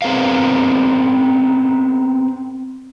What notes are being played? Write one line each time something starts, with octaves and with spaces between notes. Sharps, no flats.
B3 C4 G#4 A#4 B4 F5